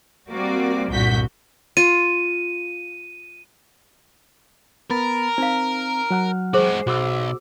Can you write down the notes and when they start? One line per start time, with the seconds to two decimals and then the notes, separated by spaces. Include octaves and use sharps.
0.29 G3 A#3 C4 F#4 D5
0.91 G1 C2 A#2 F#4 G6 B6
1.77 F4 D#7
4.91 B3 A#4 B5 A6
5.38 C4 D#4 F5
6.11 F#3 F#5 F6
6.54 G#3 F#4 G#4 C5
6.87 B1 F#4 D6 E6